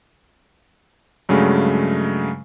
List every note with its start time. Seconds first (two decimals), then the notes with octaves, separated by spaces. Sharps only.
1.29 G2 C#3 F#3 G#3 A3